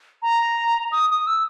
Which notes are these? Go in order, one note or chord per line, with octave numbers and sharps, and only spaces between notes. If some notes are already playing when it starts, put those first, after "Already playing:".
A#5
D#6
D#6
E6